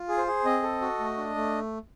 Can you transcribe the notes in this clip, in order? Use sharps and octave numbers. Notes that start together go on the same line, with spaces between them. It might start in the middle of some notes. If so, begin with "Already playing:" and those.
Already playing: F4
G#4
C5
G#4
C4 D#5
A4
F#4
A3
D4
A3